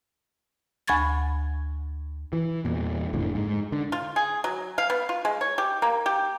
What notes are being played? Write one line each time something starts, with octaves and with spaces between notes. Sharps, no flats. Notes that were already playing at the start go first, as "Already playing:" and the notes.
D2 G#5 B5 C#6 G#6 A6
E3
E2 A#2
F#1 F2 A2 D3
G#2
D3
F4
G#4
F#3
F5
B3
F4
G#3
C#5
G4
A#3
G4